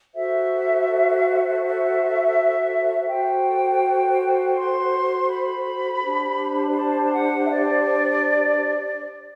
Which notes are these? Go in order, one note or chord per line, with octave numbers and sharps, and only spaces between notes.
F#4 A4 C5 E5
E5
F#4 A4 C5 G5
C6
B5
D4 G4 C5
A5
F#5
E5
D5